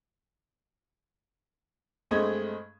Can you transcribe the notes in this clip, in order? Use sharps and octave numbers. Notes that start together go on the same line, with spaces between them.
G2 G#3 A3 C4 D#5 G#6